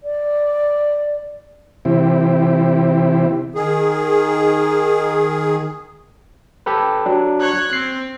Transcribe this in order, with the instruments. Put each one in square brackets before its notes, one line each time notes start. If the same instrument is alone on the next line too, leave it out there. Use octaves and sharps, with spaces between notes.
[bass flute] D5
[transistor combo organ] C3 E3 C4 E4 G4
[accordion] D#3 G#4
[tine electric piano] G4 A4 B4
F#3 D4
[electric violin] C#5 F#6
[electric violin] C4 [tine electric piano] C7